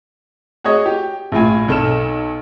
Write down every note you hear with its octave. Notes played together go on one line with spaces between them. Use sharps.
F#4 G#4 C#5 D#5
G4
A#1 A2 F4 G#5
B1 A4 F6 E7